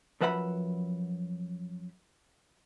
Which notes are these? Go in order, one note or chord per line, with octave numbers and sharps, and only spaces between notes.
F#2 F3 B4 E5 F#5 B5